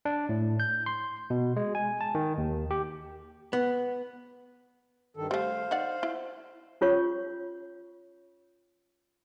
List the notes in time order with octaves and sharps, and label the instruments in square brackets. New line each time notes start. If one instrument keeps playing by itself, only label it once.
[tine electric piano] D4
A2
G6
C6
B2
G#3
G#5
A5
D#3
D#2
G4
[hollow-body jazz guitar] B3
[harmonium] G2 D#3 A4
[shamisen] G3 A3 [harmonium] C5 F5
[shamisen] D#4 D5 F#5
E4
[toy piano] C#4 F4 C#5 C#6